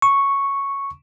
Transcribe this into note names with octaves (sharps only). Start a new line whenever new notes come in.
C#6